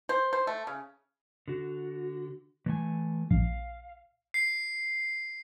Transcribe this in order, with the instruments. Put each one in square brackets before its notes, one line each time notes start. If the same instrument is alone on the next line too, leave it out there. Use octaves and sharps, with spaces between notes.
[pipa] C5
C5
A3
C#3
[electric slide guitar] D3 F#4
E3 A3 G#5
[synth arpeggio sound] A#1 [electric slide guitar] F5
[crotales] C7